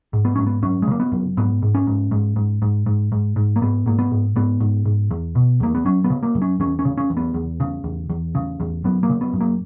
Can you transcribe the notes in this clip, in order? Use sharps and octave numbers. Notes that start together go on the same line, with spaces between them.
G#2
B3
G#2 C#4
B3
F#2 C#4
G#3
C#3 A#3
B3
F#2
G#2 B3
G#2
C#4
G#2
G#2
G#2
G#2
G#2
G#2
G#2
A#3
G#2 B3
G#2 A#3
B3
G#2
G#2 B3
G#2
G#2
E2
B2
E2 A#3
B3
F#2 C#4
B3
C#3
A#3
F#2
C#4
E2 C#4
C#4
C#3
C#4
E2
B3
E2
C#3
E2
E2
C#3
E2
F#2 B3
A#3
C#3
B3
F#2
A#3